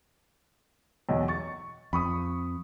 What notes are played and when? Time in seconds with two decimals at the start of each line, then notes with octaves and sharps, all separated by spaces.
1.09 B1 E2
1.28 C#6 A6
1.93 F2 B5 C#6 D#6